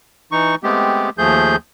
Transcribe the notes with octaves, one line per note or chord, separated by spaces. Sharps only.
E3 D#4 C#6
G#3 A3 B3 C4 G4
D#2 F3 A3 G#4 G6